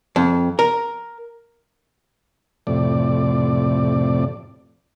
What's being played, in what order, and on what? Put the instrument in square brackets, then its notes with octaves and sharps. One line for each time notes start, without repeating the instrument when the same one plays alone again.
[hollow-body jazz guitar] F2
A#4
[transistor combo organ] F2 A2 C3 D5